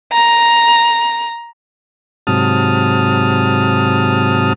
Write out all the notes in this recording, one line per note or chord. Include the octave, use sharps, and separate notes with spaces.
A#5
G#2 C3 F#3 A5 D#6 F6